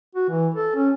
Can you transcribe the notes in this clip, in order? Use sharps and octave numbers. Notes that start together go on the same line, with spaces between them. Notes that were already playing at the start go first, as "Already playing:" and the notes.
F#4
E3
A4
C#4